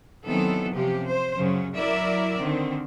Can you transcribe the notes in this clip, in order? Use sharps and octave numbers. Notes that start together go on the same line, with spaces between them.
D#3 E3 F#3 B3 C4 A4
C3 F3 C#4 G4
C5
F#2 C#3 F#3 C#4
F#3 E4 A#4 D5 E5
D3 D#3 C4